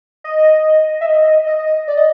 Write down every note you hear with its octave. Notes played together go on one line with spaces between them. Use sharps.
D#5
E5
D#5
D#5
D5
D#5